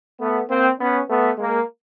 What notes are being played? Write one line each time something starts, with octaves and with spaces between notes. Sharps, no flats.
A3 B3
A#3 C4
B3 C#4
A3 B3
G#3 A#3